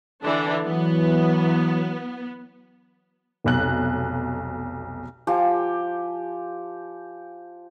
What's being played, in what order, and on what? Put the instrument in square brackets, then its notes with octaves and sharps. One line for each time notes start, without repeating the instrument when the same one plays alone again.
[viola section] D3 E3 D4
[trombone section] E3 F#3 [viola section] B3
[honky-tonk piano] F1 B1 F#6
[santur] F3 G4 G#5